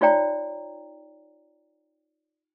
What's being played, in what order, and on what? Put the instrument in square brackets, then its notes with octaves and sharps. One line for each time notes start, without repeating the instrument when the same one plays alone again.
[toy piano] D#4 F4 C#5 D5 G5 A#5